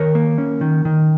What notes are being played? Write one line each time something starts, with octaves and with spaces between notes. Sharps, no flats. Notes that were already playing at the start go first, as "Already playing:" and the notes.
Already playing: D#3 A#4 C#5
A#3
C#4
D#3
D#3